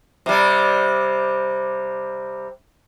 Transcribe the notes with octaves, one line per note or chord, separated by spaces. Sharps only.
C3 G3